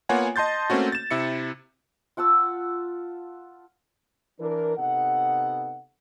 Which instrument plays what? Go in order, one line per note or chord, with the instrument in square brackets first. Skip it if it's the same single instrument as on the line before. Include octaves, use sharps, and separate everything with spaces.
[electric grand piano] A#3 B3 F4 C#5 F#5 G#5
D#5 A5 C6 G6 A6
A3 A#3 C4 C#4 F#4
A6 E7
C3 E4 C#7
[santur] F4 F#5 A5 E6
[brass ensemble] E3 D4 A#4
C3 B3 D#4 A4 F#5